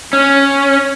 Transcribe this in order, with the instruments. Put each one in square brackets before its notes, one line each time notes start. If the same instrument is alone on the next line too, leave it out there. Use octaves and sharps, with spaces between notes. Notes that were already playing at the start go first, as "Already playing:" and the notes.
[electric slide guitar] C#4